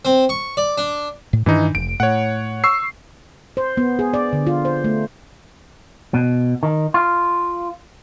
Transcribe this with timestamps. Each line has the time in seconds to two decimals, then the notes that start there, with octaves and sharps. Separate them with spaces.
0.05 C4
0.29 C#6
0.57 D5
0.78 D4
1.33 A2
1.46 G2 D#3 E3 D4 D#4
1.75 F1 D7
2.00 A2 C#5 F#5
2.64 C#6 E6 C7
3.57 C5
3.77 B3
3.99 G#4
4.14 D5
4.33 D3
4.47 F4
4.65 C5
4.84 A3
6.14 B2
6.63 D#3
6.94 F4